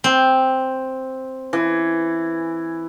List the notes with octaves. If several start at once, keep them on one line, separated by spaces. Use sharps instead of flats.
C4
E3